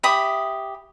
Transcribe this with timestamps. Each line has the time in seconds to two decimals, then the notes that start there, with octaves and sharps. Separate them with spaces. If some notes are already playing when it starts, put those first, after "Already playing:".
0.03 G4 E5 B5 D#6